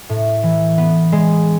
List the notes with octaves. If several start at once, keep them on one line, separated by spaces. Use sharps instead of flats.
A2
E3
B3
G#3